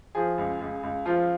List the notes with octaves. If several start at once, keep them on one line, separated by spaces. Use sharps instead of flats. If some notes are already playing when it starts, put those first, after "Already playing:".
F3 G#4
C#2
C#2
C#2
F3 F4